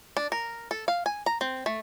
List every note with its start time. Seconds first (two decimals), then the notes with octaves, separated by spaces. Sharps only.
0.17 D4
0.32 A#4
0.71 A4
0.88 F5
1.06 G#5
1.26 A#5
1.41 C4
1.66 A3